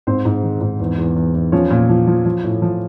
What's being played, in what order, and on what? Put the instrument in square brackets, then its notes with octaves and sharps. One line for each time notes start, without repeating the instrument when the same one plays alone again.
[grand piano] G#2 C4 C5
G#2
D#3
G#2
E2
E2
E2
E2
F3 C#4 C#5
A#2
F3
F3
F3
A2
F3